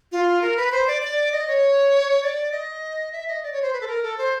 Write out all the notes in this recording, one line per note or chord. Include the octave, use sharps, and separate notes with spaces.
F4
A#4
B4
C5
D5
D5
D#5
C#5
D5
D#5
E5
D#5
D5
C#5
C5
B4
A4
A#4
A4
C5